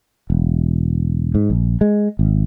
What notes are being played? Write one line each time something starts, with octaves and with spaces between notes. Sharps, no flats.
E1
G#2
A#1
G#3
G#1